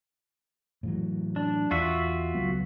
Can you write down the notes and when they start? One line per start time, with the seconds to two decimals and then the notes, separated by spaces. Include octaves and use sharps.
0.83 A2 E3 F#3
1.36 D4
1.71 E2 F4 F#4 E5
2.34 C#2 F#3 B3